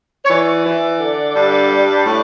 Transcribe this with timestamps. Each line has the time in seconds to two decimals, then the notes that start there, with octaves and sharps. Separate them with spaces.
0.25 C#5
0.29 E3 D5
0.65 E3
0.99 D3
1.35 G2
1.71 G3
2.05 A2